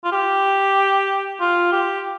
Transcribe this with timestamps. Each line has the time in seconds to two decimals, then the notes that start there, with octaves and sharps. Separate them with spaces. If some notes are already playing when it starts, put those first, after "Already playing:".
0.04 F4
0.12 G4
1.40 F4
1.72 G4